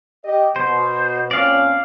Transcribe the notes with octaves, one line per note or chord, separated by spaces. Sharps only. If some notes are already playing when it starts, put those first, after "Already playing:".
G4 D#5
B2 C5
A#2 C4 C#4 D5 F5